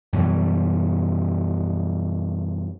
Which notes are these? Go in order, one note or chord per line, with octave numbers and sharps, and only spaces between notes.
F#2 B2 E3 G3